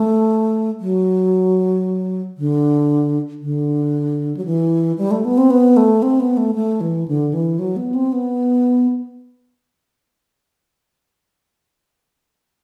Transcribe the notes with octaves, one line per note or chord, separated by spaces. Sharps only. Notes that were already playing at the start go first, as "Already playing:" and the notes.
Already playing: A3
F#3
D3
D3
F#3
E3
G3
A3
B3
C4
B3
A3
C4
B3
A3
A3
E3
D3
E3
F#3
B3
C4
B3